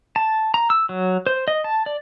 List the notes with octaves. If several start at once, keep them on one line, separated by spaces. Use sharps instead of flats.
A5
A#5
E6
F#3
C5
D#5
A5
D5